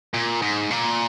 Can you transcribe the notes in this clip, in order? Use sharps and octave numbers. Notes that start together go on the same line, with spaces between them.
A#2
G#2
A#2